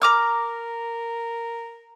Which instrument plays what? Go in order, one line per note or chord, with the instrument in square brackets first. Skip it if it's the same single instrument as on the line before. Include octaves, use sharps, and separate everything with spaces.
[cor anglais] A#4 [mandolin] A#5 D6 F6